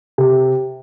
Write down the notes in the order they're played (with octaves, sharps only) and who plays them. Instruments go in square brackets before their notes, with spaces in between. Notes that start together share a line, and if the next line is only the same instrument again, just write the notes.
[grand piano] C3